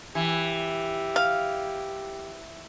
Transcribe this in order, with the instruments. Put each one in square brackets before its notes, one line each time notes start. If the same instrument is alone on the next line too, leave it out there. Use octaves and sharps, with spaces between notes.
[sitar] E3 [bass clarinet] G4
[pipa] F5